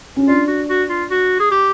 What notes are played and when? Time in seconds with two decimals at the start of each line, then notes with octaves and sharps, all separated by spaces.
0.16 C#4
0.27 D4 F4
0.48 F#4
0.69 F#4
0.89 F4
1.10 F#4
1.40 G#4
1.51 G4